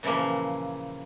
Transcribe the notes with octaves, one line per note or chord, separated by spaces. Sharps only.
A#2 C#3 E3 F3 A#3